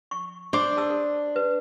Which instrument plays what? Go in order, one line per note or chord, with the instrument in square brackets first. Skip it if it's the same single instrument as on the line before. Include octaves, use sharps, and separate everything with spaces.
[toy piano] C#6
[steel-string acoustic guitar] D4 [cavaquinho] C5 D6
[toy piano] A4 A5 E6
A4
B4